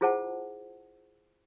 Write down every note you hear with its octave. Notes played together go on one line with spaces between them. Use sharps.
E4 F4 G#4 C5 F#5 A5